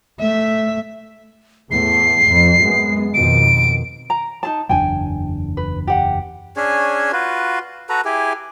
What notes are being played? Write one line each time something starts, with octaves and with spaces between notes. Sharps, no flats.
A3 E5
E2 A2 A3 C7
F2
F#2 G#3 B3
F2 B2 D#3 D7
A#5
D#4 G#4 A5
F#1 E2 D4 G5 G#5
B4
G4 F#5
C#4 D4 G#4 C#5
F4 F#4 B4
F#4 A4 B4 A#5
E4 G4 G#4